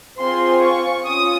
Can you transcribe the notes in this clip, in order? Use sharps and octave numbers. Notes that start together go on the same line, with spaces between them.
C4 F4 G#4 C6
C#6
C#4 F4 D#6